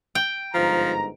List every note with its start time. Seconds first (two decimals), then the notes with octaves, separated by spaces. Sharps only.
0.15 G5
0.54 G1 G#2 F3 A#5